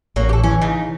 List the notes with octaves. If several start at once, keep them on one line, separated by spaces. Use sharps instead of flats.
A1 F#3 A#3
G4 A4
E3 C#4
C#3 D#4